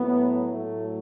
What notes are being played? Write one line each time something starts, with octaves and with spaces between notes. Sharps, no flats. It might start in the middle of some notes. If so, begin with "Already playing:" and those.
Already playing: A2 F#3 B3
A2 F#3 A3